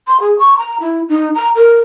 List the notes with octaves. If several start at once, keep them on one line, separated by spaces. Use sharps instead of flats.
C6
G#4
C#6
A#5
E4
D#4
A#5
A#4